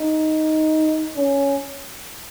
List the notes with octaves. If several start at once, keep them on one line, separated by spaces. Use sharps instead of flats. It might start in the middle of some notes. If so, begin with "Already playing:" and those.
Already playing: D#4
C#4